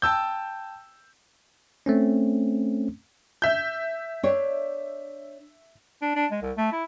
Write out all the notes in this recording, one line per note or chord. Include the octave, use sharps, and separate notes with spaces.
G5 A5 E6 G6
A3 C4 C#4
E5 G6
D4 C#5
D4
D4
G#3
C2
A3
E4